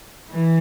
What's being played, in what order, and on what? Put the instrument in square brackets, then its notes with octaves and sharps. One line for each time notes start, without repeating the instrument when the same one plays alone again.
[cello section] E3